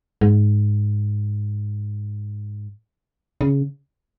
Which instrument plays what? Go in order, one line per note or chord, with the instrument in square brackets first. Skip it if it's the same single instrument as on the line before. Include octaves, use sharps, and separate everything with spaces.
[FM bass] G#2
C#3